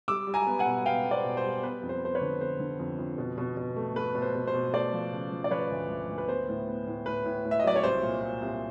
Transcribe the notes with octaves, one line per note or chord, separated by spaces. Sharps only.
G3 D6 E6
G3
G#5 A#5
B3
F#5 G#5
B2
B3 F5 G5
B3
C5 D5
B2
C5
G3
B3 B4
F2
C5
B3 C5
B4 C#5
D3
B3 C5
D3
F2
F2
B2
B2
B2
A3
A3 B4
B2
C5
B2
C5
B2
A3 C5 D5
F3
C#3
F3
D5
F3 B4 C#5
D2
D2
D2
B4
B3 C5
A2
B3
A2
A2 B4
A2
A2
E5
D#5
F#3 D5
C#5
C2 C5
A#2
A#2
C2